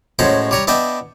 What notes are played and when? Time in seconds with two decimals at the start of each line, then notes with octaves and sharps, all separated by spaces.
0.19 A2 G#3 C#4 F#4 C5
0.51 G3 C#5 A#5
0.67 B3 D4 D#5 E5 G5